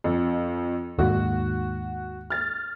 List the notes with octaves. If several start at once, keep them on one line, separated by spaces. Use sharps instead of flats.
F2
D#2 G#2 F#4
F6 A6